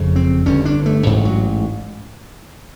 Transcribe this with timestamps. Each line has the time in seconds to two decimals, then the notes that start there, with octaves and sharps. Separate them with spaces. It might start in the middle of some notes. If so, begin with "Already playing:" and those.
Already playing: F#1 F2 C#3
0.16 C4
0.45 G1 G2 D3 C#4
0.65 D4
0.86 A3
1.06 A1 G#2
1.25 F#3